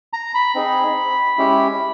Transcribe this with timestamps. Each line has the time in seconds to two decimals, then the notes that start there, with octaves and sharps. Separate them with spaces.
0.13 A#5
0.34 B5
0.55 C4 D#4 G#4
1.38 G#3 C#4 E4 G4